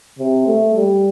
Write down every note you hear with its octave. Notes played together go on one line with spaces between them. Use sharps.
C3
A3
G3